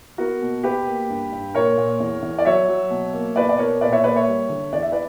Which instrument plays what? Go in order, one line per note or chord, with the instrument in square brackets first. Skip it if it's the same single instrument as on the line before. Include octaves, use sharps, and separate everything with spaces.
[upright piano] B3 F#4 A#4
B2
B2 G4 B4
A#3
G2
G2
A#2 A#4 C#5
A#2
E2
E2
D5
F#3 C#5 E5
F#3
B2
A#3
B2 B4 D5
D5
B2 A#4 C#5
A#2 B4 D5
C#5 E5
A#3 B4 D5
C#5 E5
G3
D3
E2 D5
E5
B4 D5